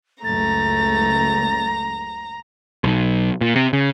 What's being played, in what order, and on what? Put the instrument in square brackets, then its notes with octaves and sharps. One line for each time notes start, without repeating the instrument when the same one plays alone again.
[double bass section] F#1 C#2 [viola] A3 [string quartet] A#5 [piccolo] A6
[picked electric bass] B1
A#2
C3
C#3